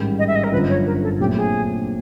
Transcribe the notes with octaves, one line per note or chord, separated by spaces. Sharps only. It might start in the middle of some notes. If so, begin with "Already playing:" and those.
Already playing: A1 G#2 D#3 G3
D#5
E5
D#5
A#4
G1 F#2 D3 F3 B4
C#5
A#4
A4
A#1 A#2 F#3 A3 C4 G4
G#4